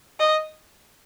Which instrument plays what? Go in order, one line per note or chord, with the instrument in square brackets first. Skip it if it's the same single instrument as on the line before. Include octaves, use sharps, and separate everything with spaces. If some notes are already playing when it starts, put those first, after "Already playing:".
[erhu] D#5